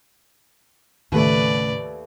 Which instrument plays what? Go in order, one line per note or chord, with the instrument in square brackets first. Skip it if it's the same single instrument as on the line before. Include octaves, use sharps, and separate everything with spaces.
[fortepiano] D#2 A3 [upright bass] A2 C#3 [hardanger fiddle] B4 D5